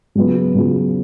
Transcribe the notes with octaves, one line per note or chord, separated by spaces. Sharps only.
C#3 F#3 B3 F4
C#3 F#3 B3 F4